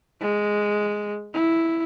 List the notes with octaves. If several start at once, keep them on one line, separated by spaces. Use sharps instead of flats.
G#3
E4